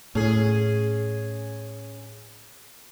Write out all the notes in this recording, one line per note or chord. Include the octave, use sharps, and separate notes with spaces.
A2 C#4 G#4